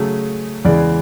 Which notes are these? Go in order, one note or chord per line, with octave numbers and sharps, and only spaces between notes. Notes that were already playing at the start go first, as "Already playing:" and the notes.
Already playing: C#3 F#3 A3 G#4
E2 C#3 E3 G#3 D5